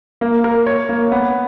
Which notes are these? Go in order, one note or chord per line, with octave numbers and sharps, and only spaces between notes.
A#3
A#4
C#5
A#3
B3